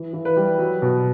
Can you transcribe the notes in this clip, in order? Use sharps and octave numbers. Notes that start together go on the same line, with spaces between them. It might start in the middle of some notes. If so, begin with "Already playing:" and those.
Already playing: E3
E3
B4
G3
F#3
B2